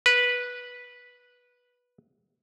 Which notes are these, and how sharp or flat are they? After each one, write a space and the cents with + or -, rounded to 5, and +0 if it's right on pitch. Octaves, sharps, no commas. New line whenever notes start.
B4 -10